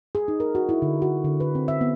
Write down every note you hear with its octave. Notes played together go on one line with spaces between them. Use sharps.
G#4
D#4
A#4
F#4
E4
D3
F#4
D3
B4
C4
E5
B3